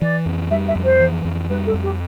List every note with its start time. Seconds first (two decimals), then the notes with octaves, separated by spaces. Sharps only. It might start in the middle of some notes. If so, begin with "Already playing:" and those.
0.01 E3 D5
0.26 F2
0.50 G3 E5
0.68 E5
0.76 F2
0.84 C5
1.00 E3
1.25 F2
1.49 G3 B4
1.66 A4
1.74 F2
1.83 G4